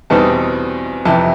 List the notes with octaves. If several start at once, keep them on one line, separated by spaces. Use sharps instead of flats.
E2 B2 G3 C4 D#4 A5
F2 C3 E3 A5